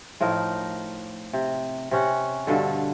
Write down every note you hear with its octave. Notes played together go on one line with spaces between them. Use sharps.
A2 F3 D#4 A#4
C3
C3 C#4 F#5
G2 B2 D3 A4